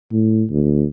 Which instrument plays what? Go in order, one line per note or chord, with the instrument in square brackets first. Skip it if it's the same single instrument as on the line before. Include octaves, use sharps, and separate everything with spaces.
[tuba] A2
D2